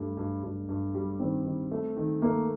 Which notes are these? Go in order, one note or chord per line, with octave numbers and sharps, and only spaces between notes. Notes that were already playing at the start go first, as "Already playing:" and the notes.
Already playing: G2 G3 A3
G2
G2
G2
G3
D#3 C4
D#3
A3
D#3
A3 A#3